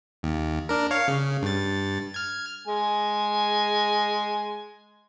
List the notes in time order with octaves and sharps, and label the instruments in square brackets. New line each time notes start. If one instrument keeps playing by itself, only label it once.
[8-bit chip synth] D#2
D4 A#4
C#5 F5
C#3
G2 A6
F6 G#6
[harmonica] G#3 G#5